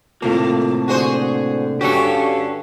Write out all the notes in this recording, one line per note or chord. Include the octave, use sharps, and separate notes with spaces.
A2 C3 A3 A#3 F4
D3 F#4 G#4 C5
G2 C#4 F#4 G4 A4